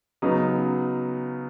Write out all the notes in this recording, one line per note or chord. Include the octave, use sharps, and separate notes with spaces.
C#3 F#3 B3 D#4